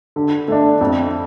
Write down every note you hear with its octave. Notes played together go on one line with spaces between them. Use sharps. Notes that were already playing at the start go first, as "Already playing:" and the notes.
D3
A3 D4
F2